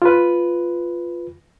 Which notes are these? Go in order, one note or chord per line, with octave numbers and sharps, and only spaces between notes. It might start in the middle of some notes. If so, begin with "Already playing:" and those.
F4 B4